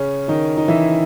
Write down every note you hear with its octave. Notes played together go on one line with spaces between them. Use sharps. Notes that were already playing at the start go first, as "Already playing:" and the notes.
Already playing: C#3 C#4
D#3 D#4
D#4
E3 E4